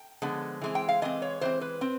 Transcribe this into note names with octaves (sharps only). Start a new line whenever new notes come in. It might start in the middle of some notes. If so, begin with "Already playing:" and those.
Already playing: G5
D3 F3 G#3 B3
E3 G#3 C4
G5
F5
E3 G#3 C4 D#5
C#5
E3 G#3 C4 C5
B4
C4